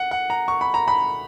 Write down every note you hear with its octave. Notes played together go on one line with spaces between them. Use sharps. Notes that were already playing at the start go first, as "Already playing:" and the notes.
Already playing: F#5
F#5
A#5
C#6
B5
A#5
B5